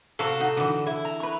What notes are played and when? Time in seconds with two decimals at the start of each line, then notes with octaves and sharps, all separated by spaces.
0.19 C3 F#4 A4 F5 F#5 A#5
0.40 D#4 F#4
0.57 D3 E3
0.87 E4
1.05 A#5
1.20 B4 C#6